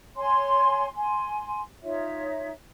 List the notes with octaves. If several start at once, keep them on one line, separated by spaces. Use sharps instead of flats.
C#5 G#5 C6
G#5 C6
D#4 F4 C#5 E5